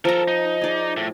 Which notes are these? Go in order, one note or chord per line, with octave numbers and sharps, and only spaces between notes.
F3 A4 A#4 A#5
D#4
G#4 D5
A2